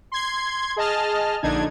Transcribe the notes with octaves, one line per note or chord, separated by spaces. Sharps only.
C6 G#6
G#4 D#5 A5 F6
A#1 D3 D4 D#4 G#6